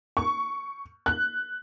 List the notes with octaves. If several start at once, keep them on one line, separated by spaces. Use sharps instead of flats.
C#6
F#6